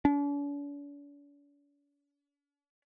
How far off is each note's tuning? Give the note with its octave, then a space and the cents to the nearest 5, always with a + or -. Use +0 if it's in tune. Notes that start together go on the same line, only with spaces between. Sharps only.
D4 -45